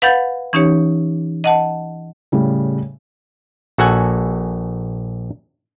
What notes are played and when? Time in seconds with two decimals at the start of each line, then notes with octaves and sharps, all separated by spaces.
0.02 B4 F5 F#5 B5 G6 A6
0.53 E3 C#4 D#4 G4 C#5
1.44 D#5 F#5 A5
2.32 A2 C#3 G3
3.78 A#1 F#4 A4 F#5 G#5